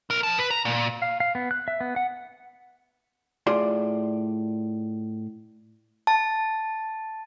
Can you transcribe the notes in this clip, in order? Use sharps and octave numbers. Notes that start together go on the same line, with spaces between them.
B1 A#4
F3 A5
B4
A#5
A#2
F5
F5
B3
F#6
E5
B3
F#5
A2 F4 G#4 D5 C6
A5